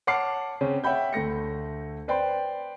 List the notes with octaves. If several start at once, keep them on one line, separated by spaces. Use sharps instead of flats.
C#5 F#5 A5 D6 F6 C7
C#3 C4 C#4
C#5 E5 F#5 G5 B5 G6
D2 A3 A#6 C#7
B4 C5 D5 G5 B5 C6